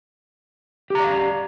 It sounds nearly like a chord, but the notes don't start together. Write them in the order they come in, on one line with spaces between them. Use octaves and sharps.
G4 A#5 D5 F5